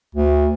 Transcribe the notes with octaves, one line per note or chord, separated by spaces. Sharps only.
D2